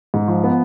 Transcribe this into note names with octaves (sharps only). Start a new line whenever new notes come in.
G#2
F3
B3